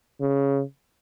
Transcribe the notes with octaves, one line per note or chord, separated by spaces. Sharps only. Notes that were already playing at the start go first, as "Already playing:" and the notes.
C#3